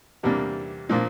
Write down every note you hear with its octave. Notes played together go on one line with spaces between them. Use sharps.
E2 C3 G3 A#3 D4
A#2 F3 A#3 D4